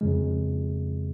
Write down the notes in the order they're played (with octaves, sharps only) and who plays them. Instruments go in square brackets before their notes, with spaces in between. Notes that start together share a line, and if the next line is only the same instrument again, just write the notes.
[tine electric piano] F2 C#3 G#3